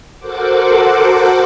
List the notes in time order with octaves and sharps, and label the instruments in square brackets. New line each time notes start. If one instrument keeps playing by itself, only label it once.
[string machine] F#4 A4 A#4 C5 F#5 D6